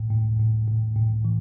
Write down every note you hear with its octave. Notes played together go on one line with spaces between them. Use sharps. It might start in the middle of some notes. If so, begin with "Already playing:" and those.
Already playing: A2
A2
A2
A2
A2
E3